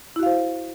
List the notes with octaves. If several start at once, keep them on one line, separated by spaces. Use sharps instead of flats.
E4 F#4 C5 F5